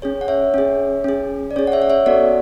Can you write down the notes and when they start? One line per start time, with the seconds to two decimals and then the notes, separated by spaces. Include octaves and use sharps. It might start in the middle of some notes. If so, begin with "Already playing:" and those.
0.02 C#4 G#4 C#5
0.21 F#5
0.28 C#5 E5
0.54 C#4 G#4
1.04 C#4 G#4
1.51 D5
1.56 C#4 G#4 C#5
1.67 F#5
1.72 C#5 E5
1.82 F#5
1.90 C#5 E5
2.06 B3 F#4 A4 D5 F#5